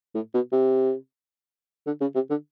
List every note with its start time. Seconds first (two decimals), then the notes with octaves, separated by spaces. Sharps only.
0.14 A2
0.34 B2
0.52 C3
1.86 D3
2.01 C#3
2.15 C3
2.30 D3